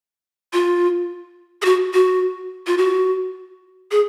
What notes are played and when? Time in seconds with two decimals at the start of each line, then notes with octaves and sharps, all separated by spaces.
0.53 F4
1.62 G#4
1.65 F#4
1.93 F#4
2.67 F4
2.78 F#4
3.91 G#4